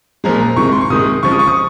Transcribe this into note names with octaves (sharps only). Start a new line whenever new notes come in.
A#2 F3 G#3 A#5
A#5
C3 D#3 G#3 C#6
C6
C#6
C3 D#3 G#3 D#6
C#3 F3 G#3 C#6
D#6
C#6
D#6